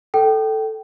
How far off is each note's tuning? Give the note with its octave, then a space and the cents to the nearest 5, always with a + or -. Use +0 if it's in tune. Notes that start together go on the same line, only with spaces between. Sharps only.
A4 +0 G5 -20